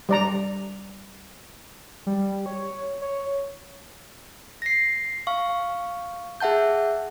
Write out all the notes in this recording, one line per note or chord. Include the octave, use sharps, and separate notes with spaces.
G3 D5 A#5
G3
C#5
C#5
A#6 C7
F5 C#6
G#4 E5 F#5 A5 G6